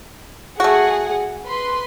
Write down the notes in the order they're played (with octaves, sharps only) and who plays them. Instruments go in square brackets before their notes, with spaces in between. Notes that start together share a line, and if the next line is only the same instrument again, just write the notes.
[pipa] A3 F#4 [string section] G#4 F#5
[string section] B4 C6